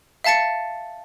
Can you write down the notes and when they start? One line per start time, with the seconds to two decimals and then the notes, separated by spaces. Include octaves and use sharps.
0.24 E5 F5 A5 A6 C#7